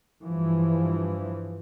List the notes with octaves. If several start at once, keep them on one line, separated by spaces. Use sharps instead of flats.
G2 E3 F3